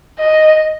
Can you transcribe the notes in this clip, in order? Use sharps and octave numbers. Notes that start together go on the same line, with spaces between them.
D#5